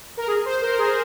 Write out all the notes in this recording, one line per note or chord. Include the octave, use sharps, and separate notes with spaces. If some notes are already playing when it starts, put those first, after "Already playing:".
A#4
G#4
C5
A#4
G#4